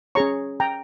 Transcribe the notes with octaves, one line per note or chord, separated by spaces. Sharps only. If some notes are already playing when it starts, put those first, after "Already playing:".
C#4 G#4 C#5 A#5 C#6
G5 A#5